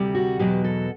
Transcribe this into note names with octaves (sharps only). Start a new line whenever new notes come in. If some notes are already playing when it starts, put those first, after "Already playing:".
Already playing: D2 C3 G3
F#4
E2 B2 F#3 G4
A4